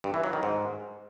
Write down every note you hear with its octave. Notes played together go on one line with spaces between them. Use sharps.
G2
E3
F#3
D#3
G#2